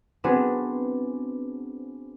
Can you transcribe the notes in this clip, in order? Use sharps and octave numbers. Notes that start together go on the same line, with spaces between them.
B3 C4 D4 F#4 G#4 B4